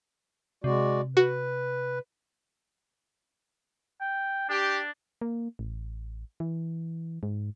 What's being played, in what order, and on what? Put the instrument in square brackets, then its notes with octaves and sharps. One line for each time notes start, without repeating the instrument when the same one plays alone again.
[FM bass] C3 [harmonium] G#3 F#4 D5
[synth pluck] F#4 [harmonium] B4
[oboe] G5
[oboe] D4 [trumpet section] G4
[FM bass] A#3
A1
E3
G#2